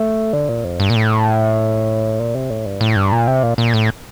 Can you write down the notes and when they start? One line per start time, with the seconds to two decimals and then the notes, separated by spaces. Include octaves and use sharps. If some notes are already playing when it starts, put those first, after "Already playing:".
Already playing: A3
0.33 D3
0.49 A#2
0.64 F2
0.80 G2
0.90 A#2
0.96 A2
2.19 A#2
2.35 C3
2.50 A2
2.66 G2
2.81 A2
2.96 G2
3.12 A#2
3.27 C3
3.43 A#2
3.58 A#2
3.74 A2